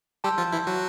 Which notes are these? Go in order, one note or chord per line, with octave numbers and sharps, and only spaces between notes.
G3 G4 A5 C6 E6 G6
F3 F4
E3 E4
F#3 F#4